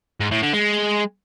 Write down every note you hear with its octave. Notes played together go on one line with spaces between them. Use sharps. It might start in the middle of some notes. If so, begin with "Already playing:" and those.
G#2
A2
D3
G#3